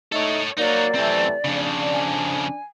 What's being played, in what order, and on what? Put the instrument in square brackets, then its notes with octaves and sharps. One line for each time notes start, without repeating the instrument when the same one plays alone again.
[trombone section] A3 D#4 [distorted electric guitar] A4 C#5
[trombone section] F#3 A#3 [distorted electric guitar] D#4 F#4 [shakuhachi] D5
[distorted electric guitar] F#2 C4 [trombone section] C3 E3 A3
[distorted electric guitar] F2 C#3 [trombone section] D4
[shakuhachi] G#5